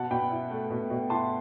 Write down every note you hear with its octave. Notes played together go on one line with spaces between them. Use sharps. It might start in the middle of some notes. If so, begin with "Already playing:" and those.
Already playing: B2 F#5 A5
B2 G5 B5
E4
A3
B2
B2
E4 A5 C6